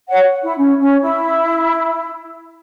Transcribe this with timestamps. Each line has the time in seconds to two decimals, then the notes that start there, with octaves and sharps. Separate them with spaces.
0.09 C#5 F#5
0.42 E4
0.57 C#4
0.80 C#4
1.02 E4